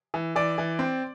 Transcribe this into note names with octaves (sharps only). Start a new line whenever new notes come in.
E3
E3 D5
E3
C4